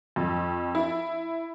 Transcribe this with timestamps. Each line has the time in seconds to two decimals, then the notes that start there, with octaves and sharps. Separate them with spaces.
0.16 F2
0.75 E4